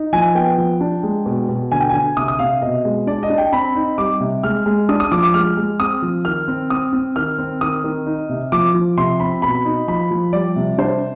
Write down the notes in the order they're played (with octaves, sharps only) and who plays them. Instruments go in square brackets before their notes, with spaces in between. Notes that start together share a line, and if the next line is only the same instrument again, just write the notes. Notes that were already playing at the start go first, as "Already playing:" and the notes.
Already playing: [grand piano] D#4
F3 G#5
B3 G5
F3
D4
G#3
B2
B2
D3 G#5
G5
D3 G#5
C3 D#6
D#6
C3 F5
B2 D#5
G#3
D4 D5
D#5
D4
G5
C4 B5
D#4
G3 D6
C3
G#3 F6
G#3
D4 D#6
D#6
F3 D6
D6
G#3 F6
G#3
C4 D#6
F3
D#3 F6
C4
C4 D#6
C4
D#3 F6
C4
D#3 D#6
D#3
D#4
C3
F3 D6
F3
C3 C6
C4 B5
B2 B5
D#4
F3 B5
F3
G3 D5
C3
D4 C5